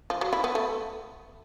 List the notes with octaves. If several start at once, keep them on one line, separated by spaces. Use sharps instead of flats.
F3
F#3
E4
B3
A3